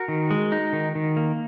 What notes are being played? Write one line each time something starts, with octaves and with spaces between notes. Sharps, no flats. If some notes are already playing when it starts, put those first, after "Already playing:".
Already playing: F#4 A#4
D#3
G#3
D#4
D#3
D#3
A#3